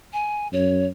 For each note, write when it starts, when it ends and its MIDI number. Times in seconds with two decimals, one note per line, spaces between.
0.13 0.48 80
0.53 0.88 42
0.53 0.86 73